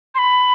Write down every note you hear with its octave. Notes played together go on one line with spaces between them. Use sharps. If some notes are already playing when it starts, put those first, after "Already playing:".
C6
B5